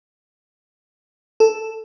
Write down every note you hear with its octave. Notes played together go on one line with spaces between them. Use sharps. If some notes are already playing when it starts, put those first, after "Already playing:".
A4